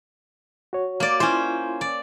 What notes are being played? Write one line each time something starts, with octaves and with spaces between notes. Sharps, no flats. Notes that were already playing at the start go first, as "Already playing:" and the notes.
F#4 C#5
A#3 D5
C#4 E4 F4 C5 C6
D5